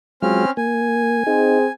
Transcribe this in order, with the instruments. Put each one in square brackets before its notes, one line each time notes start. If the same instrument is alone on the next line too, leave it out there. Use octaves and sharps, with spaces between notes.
[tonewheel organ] F#3 G#3 F4 [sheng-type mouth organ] C4 C#4 F6
[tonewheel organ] A#3 [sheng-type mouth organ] G#5
[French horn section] C4 G#4 [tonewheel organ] D#4